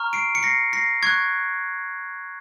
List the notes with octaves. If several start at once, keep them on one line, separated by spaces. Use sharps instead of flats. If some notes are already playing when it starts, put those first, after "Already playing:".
Already playing: A#5 C#6 F6
C7 D7
C#7
A#6 C7
A#6 C7
C#6 F#6 G#6